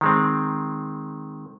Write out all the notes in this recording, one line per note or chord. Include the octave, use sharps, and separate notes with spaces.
D#3 G#3 C4